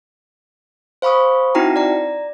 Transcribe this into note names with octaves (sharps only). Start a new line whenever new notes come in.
C5 F5 B5 C#6 D#6
C4 D#4 E4 F#4 G5 A#5
D5 A#5